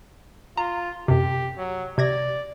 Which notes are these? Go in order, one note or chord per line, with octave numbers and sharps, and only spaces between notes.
F4 A#5
F#2 C3 G4
F#3
C3 D5 G#6 A#6